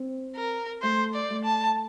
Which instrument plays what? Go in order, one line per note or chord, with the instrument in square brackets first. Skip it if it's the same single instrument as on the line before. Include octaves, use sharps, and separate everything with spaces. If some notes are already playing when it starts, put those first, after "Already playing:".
Already playing: [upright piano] C4
[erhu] A#4
[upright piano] A3 [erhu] C5
[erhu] D5
[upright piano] A3
[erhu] A5